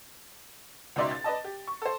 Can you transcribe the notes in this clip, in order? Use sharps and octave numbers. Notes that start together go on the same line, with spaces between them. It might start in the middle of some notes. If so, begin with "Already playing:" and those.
C#2 B2 D#4 D5 E5 C6
A6
B4 D5 D#5 A5
G4
C#6
A4 C5